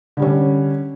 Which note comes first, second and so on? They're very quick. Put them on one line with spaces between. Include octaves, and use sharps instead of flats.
D3 G3 C#4